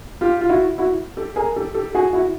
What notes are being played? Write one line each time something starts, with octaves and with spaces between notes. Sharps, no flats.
F4 G4
F4
E4 F#4
E4 F#4
G4 A4
G#4 A#4
G4 A4
G4 A4
F#4 G#4
E4 F#4